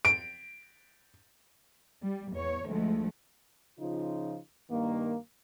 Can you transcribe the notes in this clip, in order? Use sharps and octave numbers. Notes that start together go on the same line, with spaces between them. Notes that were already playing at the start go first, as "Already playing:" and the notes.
D7
G3
E2 C#5
D2 F3 G#3 A3
C#3 F3 D#4 F4
G2 D#3 A#3